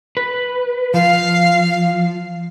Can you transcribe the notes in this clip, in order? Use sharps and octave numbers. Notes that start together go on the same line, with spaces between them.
B4
F3 F5